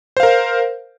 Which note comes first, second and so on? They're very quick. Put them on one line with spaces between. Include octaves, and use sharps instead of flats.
C5 F5 A#4